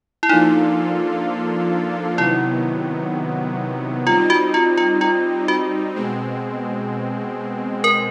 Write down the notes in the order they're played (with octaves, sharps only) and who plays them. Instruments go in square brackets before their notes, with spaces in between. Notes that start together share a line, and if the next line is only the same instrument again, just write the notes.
[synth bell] E4
[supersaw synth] F3 A#3 D4 F4 A4 [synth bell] D#4
[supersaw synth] C3 D#3 F#3 B3 [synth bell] E4
[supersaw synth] G3 C4 D#4 [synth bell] F4
[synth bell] F#4
F4
F4
F4
F#4
[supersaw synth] B2 G#3 C4
[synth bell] A#4